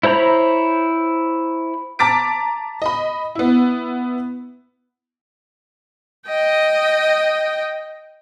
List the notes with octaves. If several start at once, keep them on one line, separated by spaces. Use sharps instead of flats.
E4 C5 C#5 A#5 B5
A5 A#5 D6 A6 B6 D7
D#5 B5
B3 E4
D#5 G5